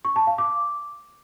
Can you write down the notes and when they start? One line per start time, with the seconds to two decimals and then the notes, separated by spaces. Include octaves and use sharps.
0.05 C#6
0.16 A5
0.27 F5
0.38 D6